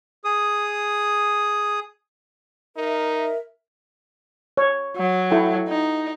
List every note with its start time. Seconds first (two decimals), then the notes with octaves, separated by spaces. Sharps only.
0.25 G#4 D#6
2.77 D#4 A#4 E5
4.57 C#5
4.96 F#3
5.31 E4 A4 G5
5.69 D#4